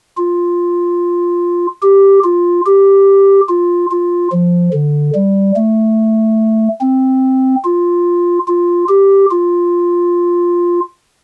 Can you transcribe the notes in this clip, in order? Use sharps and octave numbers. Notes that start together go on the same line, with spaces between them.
F4
G4
F4
G4
F4
F4
F3
D3
G3
A3
C4
F4
F4
G4
F4